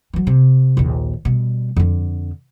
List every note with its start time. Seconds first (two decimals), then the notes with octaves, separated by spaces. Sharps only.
0.13 E3 F#3
0.27 C3
0.77 A#1 D#2
1.25 B2 G3
1.77 F2 D3